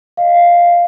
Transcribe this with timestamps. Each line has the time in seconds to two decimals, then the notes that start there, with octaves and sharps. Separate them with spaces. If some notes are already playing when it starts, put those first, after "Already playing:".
0.17 D#5 F5